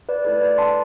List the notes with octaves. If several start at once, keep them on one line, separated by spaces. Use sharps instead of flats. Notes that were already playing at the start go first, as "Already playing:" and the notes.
B4 D5
A3 E4 A4 B4 D5
B4 D5
A5 C6